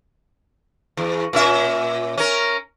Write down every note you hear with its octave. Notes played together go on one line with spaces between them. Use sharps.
E2
A#2 C#4 E5
C#4 A#4